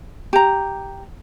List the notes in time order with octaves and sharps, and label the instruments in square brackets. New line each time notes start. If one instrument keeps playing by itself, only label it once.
[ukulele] G4 A#5